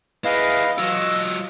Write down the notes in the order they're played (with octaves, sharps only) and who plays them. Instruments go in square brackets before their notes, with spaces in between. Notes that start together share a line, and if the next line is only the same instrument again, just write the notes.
[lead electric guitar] E4 G#4 [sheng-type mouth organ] B4 D#5 F5
[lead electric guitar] F#3 F4 [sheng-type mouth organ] D#5 [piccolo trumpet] E6